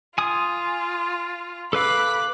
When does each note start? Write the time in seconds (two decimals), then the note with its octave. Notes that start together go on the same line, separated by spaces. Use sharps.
0.18 F4 G#5 D#6
1.73 A4 B4 F5 B5 D6 F#6